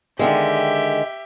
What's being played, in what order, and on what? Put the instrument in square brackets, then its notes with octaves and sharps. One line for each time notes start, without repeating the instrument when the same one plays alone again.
[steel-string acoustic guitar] D3 D#3 G#3 [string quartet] G4 E5